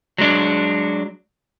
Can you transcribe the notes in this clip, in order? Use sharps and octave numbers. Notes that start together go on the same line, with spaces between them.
F#3 G#3 D4